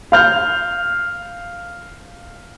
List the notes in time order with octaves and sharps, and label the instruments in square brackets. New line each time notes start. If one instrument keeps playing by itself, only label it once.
[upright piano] F5 F6 G6